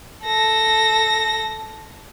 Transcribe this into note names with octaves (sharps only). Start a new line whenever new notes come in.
A4 A#6